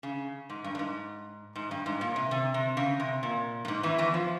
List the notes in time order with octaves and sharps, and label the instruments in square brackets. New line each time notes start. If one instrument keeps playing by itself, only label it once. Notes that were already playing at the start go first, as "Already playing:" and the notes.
[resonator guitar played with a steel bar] C#3
G#2
G2
G2
G#2
G#2
G2
G#2
A#2
C3
C3
C3
C#3
C3
A#2
G2
G#2
E2 E3
E2 E3
F3